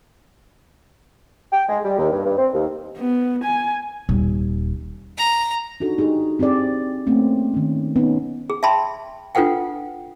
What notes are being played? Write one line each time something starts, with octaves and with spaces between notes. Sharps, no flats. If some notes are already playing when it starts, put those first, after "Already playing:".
G5
G#3
G3
D#2
G2
G2
C4
D#2
B3
G#5
D#1
A#5
D4 D#4 F#4 A4
D#4 G4 G#4
C4 G4 G#4 D5
A3 A#3 C4 C#4
D#3 C#4
B3 C#4 D#4
G#4
E5 G5 A5 B5 C6
D4 F4 A4 B4 F#5 G5